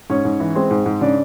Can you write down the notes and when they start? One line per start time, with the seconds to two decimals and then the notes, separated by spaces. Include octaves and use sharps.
0.10 G#2 C#4 C#5
0.25 G#2
0.40 E3
0.55 G#3 C4 C5
0.71 G#2
0.86 G#2
1.01 C#3 D4 D5